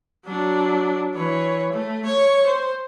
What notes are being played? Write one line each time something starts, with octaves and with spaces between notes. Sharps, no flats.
F#3 D4
E3 C#5
A3
C#5 C#6
C5